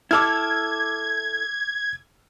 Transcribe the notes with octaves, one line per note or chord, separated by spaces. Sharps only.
E4 A4 D6 E6 F6 G#6